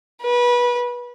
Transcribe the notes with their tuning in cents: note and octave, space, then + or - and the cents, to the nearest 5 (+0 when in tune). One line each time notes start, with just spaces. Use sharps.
B4 -25